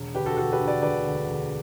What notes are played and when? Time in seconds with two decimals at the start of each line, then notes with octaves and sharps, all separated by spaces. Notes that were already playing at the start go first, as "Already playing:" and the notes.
Already playing: E1
0.15 D2 G4 B4
0.26 F#4 A4
0.37 E1 F#4 A4
0.52 G4 B4
0.60 D3
0.67 B4 D5
0.82 E1 B4 D5
1.05 D2
1.28 E1